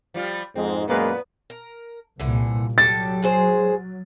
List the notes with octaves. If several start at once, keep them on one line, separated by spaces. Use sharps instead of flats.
F3 G3 F4
F2 G#2 C4
F#2 A#2 G#3 A#3 B3 B4
A#4
C2 A#2 D3 E3
F#3 G3 G4 A4 A6
G#3 G#4 C5